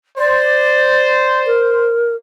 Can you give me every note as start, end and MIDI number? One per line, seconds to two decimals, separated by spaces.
0.18 1.92 72
0.18 1.50 74
1.47 2.16 70